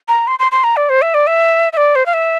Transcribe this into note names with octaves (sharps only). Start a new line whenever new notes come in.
A#5
C6
C6
C6
A#5
D5
C5
E5
D5
E5
E5
D5
C5
F5
E5